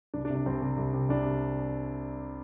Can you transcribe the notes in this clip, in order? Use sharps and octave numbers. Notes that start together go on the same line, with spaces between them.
C2 D4
D4
C3
D4
C2 C4
C3
C2
C3
C2 D4
C3